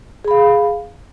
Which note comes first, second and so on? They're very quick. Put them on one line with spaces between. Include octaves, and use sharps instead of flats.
G#4 B5 F5